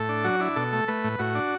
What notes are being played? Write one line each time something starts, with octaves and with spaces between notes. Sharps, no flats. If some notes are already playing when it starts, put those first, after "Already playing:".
Already playing: A2 A4
D4
F#3 F#4
D4 E4
B2 A4
A3
A3 B4
A2
A2 F#4
D4